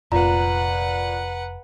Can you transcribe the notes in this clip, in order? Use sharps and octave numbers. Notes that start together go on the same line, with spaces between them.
F1 A#2 B4 F#5 A#5